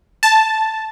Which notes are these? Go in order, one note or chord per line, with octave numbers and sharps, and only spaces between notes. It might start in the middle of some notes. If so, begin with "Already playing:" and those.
A5